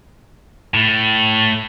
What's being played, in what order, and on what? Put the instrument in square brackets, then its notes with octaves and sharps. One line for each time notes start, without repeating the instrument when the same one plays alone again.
[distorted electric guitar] A2 A3